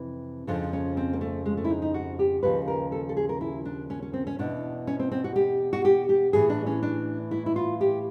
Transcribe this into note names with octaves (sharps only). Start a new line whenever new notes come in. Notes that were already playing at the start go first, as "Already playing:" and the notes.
Already playing: F2 C3 E3
F2 C#3 F3 D4
C#4
C4
A#3
A3
G#3
A3
E4
D#4
D#4
F#4
G4
D#2 C#3 F3 B4
A#4
A4
A4
G#4
A#4
E4
D4
C#4
C#4
C4
C#4
E2 B2 D4
C#4
C4
C4
F#4
G4
F#4
G4
G4
A2 E3 G#4
D4
C#4
D4
E4
E4
F4
G4